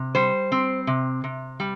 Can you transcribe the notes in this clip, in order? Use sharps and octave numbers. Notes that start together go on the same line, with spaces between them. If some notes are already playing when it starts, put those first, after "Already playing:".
Already playing: C3
G3 C5
C4
C3
C3
G3